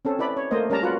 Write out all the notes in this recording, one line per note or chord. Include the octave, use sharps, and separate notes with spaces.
C4 C#4 A4
E4 B4 D5 B5
C#5
A3 A#3 C5 D#5
G3 C#4 A#4 D5 A5 A#5
F4 F#4 A#4 B4 F#5